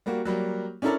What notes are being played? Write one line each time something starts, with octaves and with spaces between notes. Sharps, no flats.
G3 A#3 F#4
F#3 G3 A#3
C#4 D4 E4 A4 A#4 D5